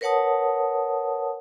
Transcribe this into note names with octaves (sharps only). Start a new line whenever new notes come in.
A#4 B4 C#5 F#5 A5 D#6